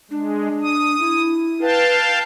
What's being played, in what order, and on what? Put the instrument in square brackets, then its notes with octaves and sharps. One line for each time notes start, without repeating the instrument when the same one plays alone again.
[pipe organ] G#3 [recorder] D4
[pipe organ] D#6
[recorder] E4
[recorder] B4 [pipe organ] F5 G5 A5